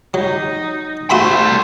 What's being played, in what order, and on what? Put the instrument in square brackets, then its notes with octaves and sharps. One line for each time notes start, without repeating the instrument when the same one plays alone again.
[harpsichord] F#3 [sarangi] D#4
[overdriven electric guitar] G3 C6 [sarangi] A3 [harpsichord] F#4 E5 B5